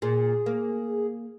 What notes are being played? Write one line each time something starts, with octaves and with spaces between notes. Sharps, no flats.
A#2 G#4
A#3